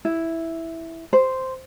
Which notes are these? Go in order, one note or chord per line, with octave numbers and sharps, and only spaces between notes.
E4
C5